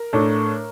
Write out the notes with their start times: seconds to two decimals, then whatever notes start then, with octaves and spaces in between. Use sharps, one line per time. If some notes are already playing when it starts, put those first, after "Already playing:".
Already playing: A#4
0.13 A2 A3 D4